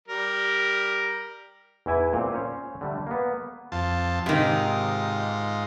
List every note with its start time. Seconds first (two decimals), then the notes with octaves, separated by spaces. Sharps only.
0.08 G3 A#4
1.86 E2 E3 E4 G#5
2.13 A#2 C4
2.33 C#4 C5 C#5
2.81 D3 G3 A3
3.07 A#3 B3
3.72 F2 F4 A5
4.26 G#2 C3 D#3 F4 D#5